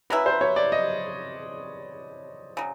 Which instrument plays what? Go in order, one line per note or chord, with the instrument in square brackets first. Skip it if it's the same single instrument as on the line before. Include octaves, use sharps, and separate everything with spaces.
[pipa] F#3 A#3 C#4 E4 [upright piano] B4
[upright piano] C5
C#5
D5
D#5
[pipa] C#3 F#3